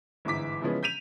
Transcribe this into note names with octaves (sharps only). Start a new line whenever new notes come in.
G1 G#2 E3 D6 B6
C#3 E3 F3 G#3 B3 C#4
G6 B6 D#7 F7